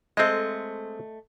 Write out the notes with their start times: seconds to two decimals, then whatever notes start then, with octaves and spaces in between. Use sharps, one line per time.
0.17 G#3 A3 C4 D#5